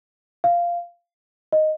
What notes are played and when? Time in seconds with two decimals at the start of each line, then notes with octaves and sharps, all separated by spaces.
0.44 F5
1.53 D#5